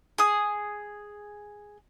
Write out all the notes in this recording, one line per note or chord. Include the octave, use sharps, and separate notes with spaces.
G#4 D#6